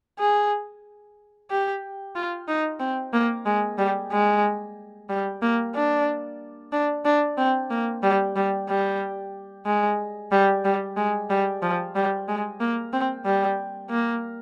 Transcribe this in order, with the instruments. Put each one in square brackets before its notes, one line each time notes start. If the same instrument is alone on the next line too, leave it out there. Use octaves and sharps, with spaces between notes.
[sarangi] G#4
G4
F4
D#4
C4
A#3
G#3
G3
G#3
G3
A#3
D4
D4
D4
C4
A#3
G3
G3
G3
G#3
G3
G3
G#3
G3
F3
G3
G#3
A#3
C4
G3
A#3